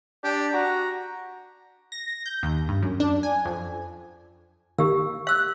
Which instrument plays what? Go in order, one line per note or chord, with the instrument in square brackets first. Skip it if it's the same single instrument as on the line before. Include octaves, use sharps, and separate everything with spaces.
[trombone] D4 [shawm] G4
[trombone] F#4 [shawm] A#5
[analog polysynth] A#6
G6
D#2
G2
F#2
D4
G#5
F2
[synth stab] D#3 A#3 [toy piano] G4 E6
[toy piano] F5 E6 [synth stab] F#6